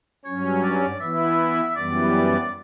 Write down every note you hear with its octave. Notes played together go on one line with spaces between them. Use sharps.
G2 F#3 C#4 C#5
D5
E3 B3 E4 E5
F#2 E3 G3 B3 D5